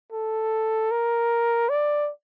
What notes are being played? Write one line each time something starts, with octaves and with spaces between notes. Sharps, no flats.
A4
A#4
D5